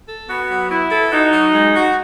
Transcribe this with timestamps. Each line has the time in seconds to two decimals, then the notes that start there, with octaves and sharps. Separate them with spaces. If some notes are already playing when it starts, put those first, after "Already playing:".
0.08 A4
0.29 B3 F#4
0.50 F#3
0.70 B3 E4
0.91 A4
1.12 D#4 F#4
1.32 F#3
1.53 G#3
1.75 F#4